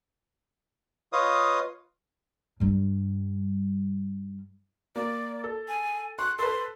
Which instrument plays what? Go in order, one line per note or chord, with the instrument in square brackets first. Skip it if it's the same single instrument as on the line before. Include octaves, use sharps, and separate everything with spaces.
[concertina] F4 B4 C#5 D#5 F5 D#6
[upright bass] G2 G3
[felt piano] A#3 [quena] D5
[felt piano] A4
[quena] G#5
[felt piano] C6 C#6 [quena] F#6
[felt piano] A4 B4 [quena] C6